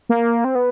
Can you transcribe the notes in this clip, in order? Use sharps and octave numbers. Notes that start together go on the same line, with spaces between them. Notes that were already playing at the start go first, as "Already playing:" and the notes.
A#3
C4
B3